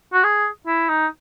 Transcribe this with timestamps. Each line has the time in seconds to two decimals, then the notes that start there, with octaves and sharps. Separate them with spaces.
0.13 F#4
0.24 G#4
0.67 E4
0.89 D#4